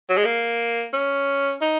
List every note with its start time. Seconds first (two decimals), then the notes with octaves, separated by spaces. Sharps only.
0.09 F#3
0.17 G#3
0.25 A#3
0.93 C#4
1.61 D#4